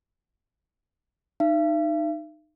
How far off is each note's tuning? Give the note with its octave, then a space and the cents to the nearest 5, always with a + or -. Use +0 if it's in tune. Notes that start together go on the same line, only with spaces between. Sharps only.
D#4 -20 E5 +45